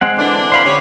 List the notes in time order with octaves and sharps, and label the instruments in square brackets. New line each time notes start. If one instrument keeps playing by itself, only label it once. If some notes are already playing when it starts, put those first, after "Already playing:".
[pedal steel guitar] G#3 C4 F#5
[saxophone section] D3 E3 D4
[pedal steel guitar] C5 F5 B5
[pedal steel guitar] D3 [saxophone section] C#4 G4 C#5